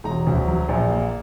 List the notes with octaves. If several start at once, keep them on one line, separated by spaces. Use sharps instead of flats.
E1 A#5
D2
F#3
A#1
A#3